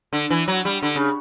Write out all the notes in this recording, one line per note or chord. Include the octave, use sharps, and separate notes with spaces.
D3
E3
F#3
G3
D3
C#3